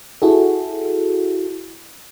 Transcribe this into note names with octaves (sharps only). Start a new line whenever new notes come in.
E4 F#4 G#4 A4